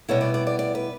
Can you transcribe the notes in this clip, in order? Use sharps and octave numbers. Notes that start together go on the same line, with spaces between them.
B2 G3 B3 E4 C#5
D5
D5
D5
D5
B4